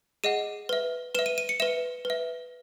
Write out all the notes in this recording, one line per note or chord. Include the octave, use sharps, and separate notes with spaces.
G#4 D#5 F#5 D#7
B4 E5
B4 E5 E7
D#7
D#7
C#7
B4 E5 E7
B4 E5